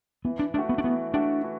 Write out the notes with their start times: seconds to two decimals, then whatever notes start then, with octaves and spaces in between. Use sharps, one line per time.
0.25 E3 B3
0.39 D4
0.54 A3 D4 F#4
0.69 B3
0.78 D4
0.84 E3 B3
1.14 A3 D4 F#4
1.44 E3